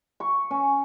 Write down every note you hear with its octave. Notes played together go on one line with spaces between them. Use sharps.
C#6
C#4